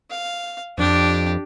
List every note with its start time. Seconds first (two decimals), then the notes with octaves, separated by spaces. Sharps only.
0.10 F5
0.78 F2 D4 G4